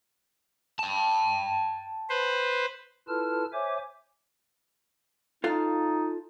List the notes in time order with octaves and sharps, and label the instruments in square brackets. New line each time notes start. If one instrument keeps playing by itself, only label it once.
[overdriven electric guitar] G5 A5
[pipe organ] B4 C5
E4 F4 A4 B4 A5 F6
C5 C#5 E5 G#5 D6
[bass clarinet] D#4 [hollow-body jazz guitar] F4 A4 F5